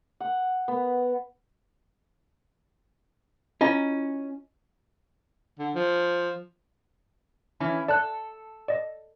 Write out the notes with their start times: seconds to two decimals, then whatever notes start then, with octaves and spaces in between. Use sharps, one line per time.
0.20 F#5
0.68 B3
3.61 C#4 E4 F4 D#5
5.59 D3
5.75 F3
7.60 E3 C#4 E4
7.88 A4 D5 A5 F#6
8.68 D5 D#5